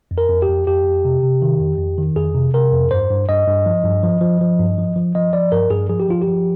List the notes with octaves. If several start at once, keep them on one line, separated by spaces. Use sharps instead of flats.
F2
A#4
F2
G4
F2
F2 G4
F2
C3
C3
D#3
F2
F2
D#3
F2 G#4
C3
C3 A#4
F2
G2 C5
G2
G2 D#5
G2
F3
G2
F3
F3
F3
G2
F3
F3
F3 D#5
F3 D5
G2 A#4
G2 G#4
F3 G#4
G4
F3 F4
G4
F3